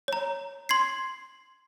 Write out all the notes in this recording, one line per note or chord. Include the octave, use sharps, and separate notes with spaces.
C#5 A#5
C6 G#6 C7